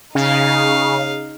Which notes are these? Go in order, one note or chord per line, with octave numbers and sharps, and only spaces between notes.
C#3 D#4 F5